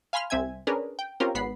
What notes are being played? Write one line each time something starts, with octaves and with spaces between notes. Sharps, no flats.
F5 G#5 B5 C6 F6
C2 C4 E5 G#5 G#6
C#4 D4 G#4 A#4 B4
G5
C4 C#4 F4 G4 A#4
G#1 B3 B5 C7